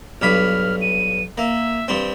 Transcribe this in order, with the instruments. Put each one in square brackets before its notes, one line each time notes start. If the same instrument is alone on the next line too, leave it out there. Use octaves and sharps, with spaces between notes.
[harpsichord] B1 G2 B5 [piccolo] F6
[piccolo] D#7
[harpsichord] A#3 [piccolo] E5
[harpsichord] G2 C4